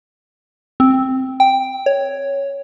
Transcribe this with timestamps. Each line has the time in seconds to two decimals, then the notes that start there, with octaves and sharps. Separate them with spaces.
0.80 C4
1.40 G5
1.86 C#5